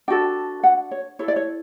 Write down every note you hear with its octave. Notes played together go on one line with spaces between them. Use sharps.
D4 F#4 A4 G5
F#5
C#5
E4 A4 C#5
D5
C#5